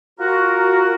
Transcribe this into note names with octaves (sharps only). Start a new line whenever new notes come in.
F4 F#4 A#4